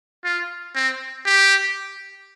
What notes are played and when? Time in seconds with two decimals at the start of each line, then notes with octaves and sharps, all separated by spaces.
0.24 F4
0.75 C4
1.26 G4